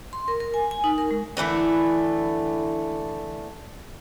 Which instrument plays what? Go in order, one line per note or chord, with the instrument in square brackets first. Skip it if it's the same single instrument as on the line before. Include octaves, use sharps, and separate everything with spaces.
[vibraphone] C6
A#4
A#4
G#5
G#5
D#4
A#4
G#3
[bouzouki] D3 E3 A3 E4